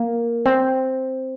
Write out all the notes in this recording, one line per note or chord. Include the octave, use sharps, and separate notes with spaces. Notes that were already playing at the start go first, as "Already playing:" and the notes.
Already playing: A#3
C4